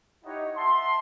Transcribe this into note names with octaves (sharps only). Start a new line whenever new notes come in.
D#4 E4 G4 C#5 D#5 F#5
E5 F#5 A5 C6